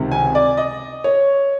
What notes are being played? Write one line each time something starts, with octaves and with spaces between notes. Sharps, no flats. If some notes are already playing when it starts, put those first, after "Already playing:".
Already playing: C#2 C3 D#3
G#5
D5
D#5
C#5